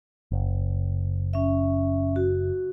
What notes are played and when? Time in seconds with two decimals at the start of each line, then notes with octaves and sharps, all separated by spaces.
0.32 F#1
1.33 C#4 E5
2.16 F#4